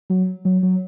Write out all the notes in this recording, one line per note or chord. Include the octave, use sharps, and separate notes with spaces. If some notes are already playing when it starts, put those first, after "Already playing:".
F#3
F#3
F#3